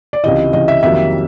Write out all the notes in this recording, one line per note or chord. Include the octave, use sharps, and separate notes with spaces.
D5
C#2 C3 E3 D#5
C#2 C3 E3 D#5
E5
F2 C3 D#3 F#3 A#3 E5